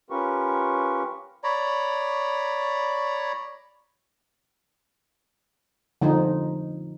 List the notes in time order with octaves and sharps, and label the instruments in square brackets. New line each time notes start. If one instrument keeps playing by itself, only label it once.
[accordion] C#4 F4 G4 A#4 B4 C#6
[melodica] C#5 D5 A#5 B5
[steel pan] D3 F3 D#4